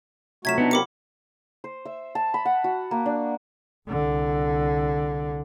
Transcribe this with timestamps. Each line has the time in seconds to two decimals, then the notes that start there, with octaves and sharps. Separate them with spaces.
0.45 C3 F#3 A3 F4 F#4 G#6 B6 E7
0.58 B3 D4 D#4
0.71 C4 G4 A#4 F5 F#5 B5 D6 C#7
1.64 C5
1.85 E5
2.15 A5
2.34 B5
2.45 F#5
2.64 F#4
2.91 A#3
3.06 D4
3.89 C2 D3